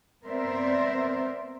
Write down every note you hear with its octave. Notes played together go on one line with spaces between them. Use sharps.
B3 C4 A#4 C5 D5 E5